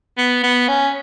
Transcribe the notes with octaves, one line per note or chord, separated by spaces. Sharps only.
B3
B3
C#4